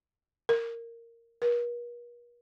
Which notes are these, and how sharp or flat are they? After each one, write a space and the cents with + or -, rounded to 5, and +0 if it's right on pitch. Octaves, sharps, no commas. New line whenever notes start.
A#4 -10
A#4 +45